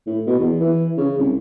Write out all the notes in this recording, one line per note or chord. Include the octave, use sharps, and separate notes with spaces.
A2
B2
E2
E3
C#3
C2